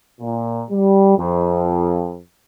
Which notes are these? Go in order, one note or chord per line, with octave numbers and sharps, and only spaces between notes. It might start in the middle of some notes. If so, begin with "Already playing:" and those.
A#2
G3
F2